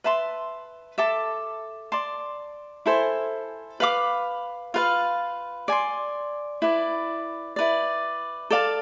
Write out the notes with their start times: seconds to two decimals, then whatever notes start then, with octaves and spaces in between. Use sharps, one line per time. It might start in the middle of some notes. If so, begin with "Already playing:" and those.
0.04 B4 E5 A5 C6
0.98 A4 E5 A5 D6
1.92 D5 A5 C6
2.86 E4 A4 C5 G#5
3.80 B4 F5 B5 D6
4.74 F4 B4 F5
5.68 D5 G#5 C6
6.62 E4 B4 D5
7.56 E4 B4 D5
8.50 A4 D5 F5 A5